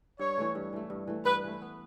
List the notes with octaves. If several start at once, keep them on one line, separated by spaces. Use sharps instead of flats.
G2 C#5
E3 A3
G2
E3 A3
G2
E3 A3
G2 B4
E3 A3
B3